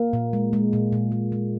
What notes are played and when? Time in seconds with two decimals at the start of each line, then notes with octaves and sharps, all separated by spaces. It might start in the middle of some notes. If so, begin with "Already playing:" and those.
Already playing: A#3
0.13 A#2
0.33 G#3
0.53 G#3
0.73 A#2
0.92 A#2
1.12 G#3
1.32 G#3